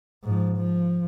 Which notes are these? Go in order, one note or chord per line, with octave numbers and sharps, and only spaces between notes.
G#2 F3
F3